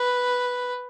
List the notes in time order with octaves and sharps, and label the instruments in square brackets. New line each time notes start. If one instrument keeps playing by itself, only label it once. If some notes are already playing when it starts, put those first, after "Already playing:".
Already playing: [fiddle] B4